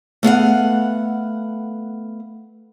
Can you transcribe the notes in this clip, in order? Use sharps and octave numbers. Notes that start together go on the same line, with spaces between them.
A3 B3 F5 F#5